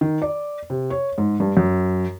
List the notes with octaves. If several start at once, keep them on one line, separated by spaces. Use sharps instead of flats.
D#3
D5
C3
C#5
G#2
G2
F#2